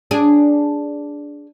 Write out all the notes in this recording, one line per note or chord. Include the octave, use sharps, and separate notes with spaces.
D4 G#4